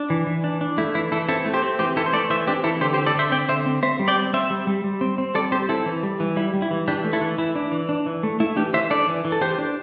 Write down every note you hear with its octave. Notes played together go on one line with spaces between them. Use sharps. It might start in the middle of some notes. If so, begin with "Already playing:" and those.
Already playing: D4
E3
E3
D4
D4
A3 E4
E3 E4
E3 E4 A4
C4 E4 A4
A3
G4 C5
C4
E3 G4 C5
E3 E4 A4
C5
A3 A4 D5
E3 C5 E5
C4 D4 G4
E3 E4 A4
D3 G4 C5
G4 C5
C4
A4 D5
D3 C5 E5
C4 D5 G5
D3 C5 E5
C4
C4 C5 E5
G3
D5 G5
C4
C4 C5 E5
G3
G3
G3
C4
C4
G3 A4 D5
C4 G4 C5
C4 E4 A4
E3
G3
E3
G3 E4
G3
E4
E3
E3 D4 G4
A3
E4 A4
E3
E3 E4
D4
E3
D4
E3
A3
A3 E4
E3 D4 G4
E3 C5 E5
D4 A4 D5
E3
E3
A4
E3 G4 C5
D4